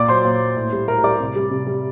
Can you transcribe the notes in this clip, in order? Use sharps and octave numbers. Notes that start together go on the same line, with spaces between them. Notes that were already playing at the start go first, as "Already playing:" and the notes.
Already playing: A#2 D5 D6
F#3 C5 C6
A#2
F#3
A2
G3
A2 A#4 A#5
G3 D5 D6
C3
G3
C3
G3